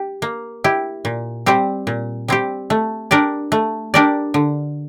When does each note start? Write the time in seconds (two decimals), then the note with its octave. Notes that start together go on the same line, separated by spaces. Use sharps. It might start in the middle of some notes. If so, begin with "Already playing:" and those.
Already playing: G4
0.22 A#3
0.64 E4 G4
1.05 A#2
1.46 G3 C4 G4
1.87 A#2
2.28 G3 C4 G4
2.70 A3
3.11 D4 G4 A#4 D5
3.52 A3
3.94 D4 G4 A#4 D5
4.34 D3